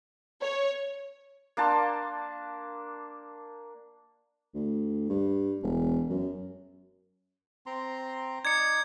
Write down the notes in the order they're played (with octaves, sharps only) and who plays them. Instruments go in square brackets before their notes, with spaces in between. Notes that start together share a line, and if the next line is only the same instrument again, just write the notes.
[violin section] C#5
[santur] A#3 D4 A5 C6
[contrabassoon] D2
G2
E1
F#2
[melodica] C4 A#5 C6
[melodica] D#4 D5 [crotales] G#6 C#7